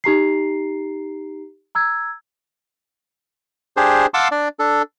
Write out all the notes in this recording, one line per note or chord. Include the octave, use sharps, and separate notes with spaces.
D#4 G4 A#5 C7
A#5 E6 G#6
D4 G4 G#4 C5
F5 F#5 A5 C6 D6 E6
D4 D5
D4 A4